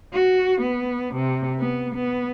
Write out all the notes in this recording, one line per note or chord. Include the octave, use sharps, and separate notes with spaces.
F#4
B3
C3
B3
B3